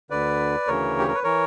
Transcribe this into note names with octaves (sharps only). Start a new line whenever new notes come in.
D2 D3 B4 D5
D2 C#3 E3 A#4 C#5
G4
A#4
B4
E3 A#4 C#5